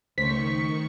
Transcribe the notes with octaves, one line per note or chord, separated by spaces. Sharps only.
C#2 D#3 A3 C5 C#6 B6